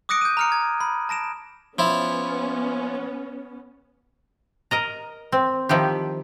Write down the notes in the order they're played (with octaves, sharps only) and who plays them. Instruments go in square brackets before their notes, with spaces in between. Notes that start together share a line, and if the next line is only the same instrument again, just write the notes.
[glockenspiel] D6 D#6 F#6 A#6 C#7 D7
G6 D#7
A#5 F6 C#7
G#6
B5
A5 A#6 D7 E7
[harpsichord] F3 E4 [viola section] B3 C#4
[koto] A#4 D#5 A#5
C4
D#3 F3 E4 G4